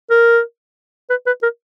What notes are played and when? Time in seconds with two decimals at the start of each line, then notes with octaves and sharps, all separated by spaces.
0.11 A#4
1.10 B4
1.27 B4
1.43 A#4